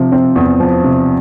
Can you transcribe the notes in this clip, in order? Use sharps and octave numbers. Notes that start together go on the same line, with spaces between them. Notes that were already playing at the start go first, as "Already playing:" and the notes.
Already playing: C3 F3
C4
E2
F3
C3